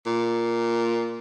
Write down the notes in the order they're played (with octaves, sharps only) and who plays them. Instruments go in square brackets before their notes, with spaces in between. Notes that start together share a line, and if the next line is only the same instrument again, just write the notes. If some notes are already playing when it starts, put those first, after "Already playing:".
[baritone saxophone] A#2